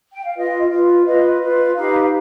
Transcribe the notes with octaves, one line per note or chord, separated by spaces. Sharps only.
G5
F5
F4 B4 D#5
F4 B4
F4 B4 D#5
F4 B4
D#4 G4 B4 F5